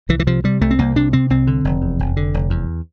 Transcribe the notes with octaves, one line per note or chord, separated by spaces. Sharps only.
C2 E3
E3
C3 F3
C3 G3
C2 A3
C4
C2 A#3
C3 D4
C3 C4
C2 C4
D3
F1
E2
F1
D3
F1
E2